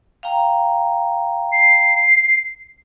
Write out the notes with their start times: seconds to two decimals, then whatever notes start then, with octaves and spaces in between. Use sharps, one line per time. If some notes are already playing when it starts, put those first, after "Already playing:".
0.23 F5 G5 A#5
1.52 C7